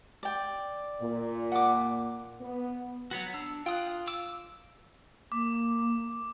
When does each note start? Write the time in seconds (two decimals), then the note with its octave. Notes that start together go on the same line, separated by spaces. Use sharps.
0.23 D5 G5
1.02 A#2
1.52 F#5 D6
2.41 B3
3.11 F#3 B3 F#4
3.34 D4 E6
3.66 F4 G5 D#6 F#6
4.08 D6 E6
5.32 A#3 D6